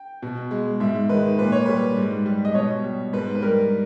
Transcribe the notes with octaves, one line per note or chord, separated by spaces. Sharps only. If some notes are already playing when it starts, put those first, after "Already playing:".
Already playing: G5
B2
G#3
G#2 E5
D#3 G#3 B4
A#2 B4
C#5
G3 B4
G#2
G3
D#5
B2 C#5
G3
G#2 B4
B4
G3 A#4